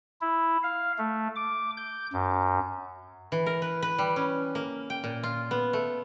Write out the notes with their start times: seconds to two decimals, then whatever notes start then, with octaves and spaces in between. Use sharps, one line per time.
0.21 E4
0.63 F5
0.98 A3
1.36 D6
1.77 G6
2.13 F#2
3.32 E3
3.46 A#4
3.62 B4
3.82 B4
3.98 G3
4.16 C#4
4.55 A#3
4.90 G5
5.04 A#2
5.23 F4
5.51 B3
5.73 A3